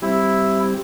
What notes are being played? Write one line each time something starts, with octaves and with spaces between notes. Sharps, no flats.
G3 C4 E4 G4